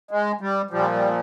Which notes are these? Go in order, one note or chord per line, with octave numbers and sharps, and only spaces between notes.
G#3
G3
A#2 F3 G3
G3